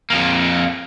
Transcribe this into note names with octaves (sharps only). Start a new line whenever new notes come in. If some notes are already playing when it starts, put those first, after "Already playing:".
F2 A#3